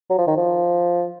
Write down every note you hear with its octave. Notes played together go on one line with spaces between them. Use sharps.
F#3
F3
D#3
F3